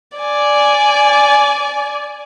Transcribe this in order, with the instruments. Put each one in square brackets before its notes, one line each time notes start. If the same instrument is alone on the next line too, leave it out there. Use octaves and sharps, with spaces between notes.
[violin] D5 G#5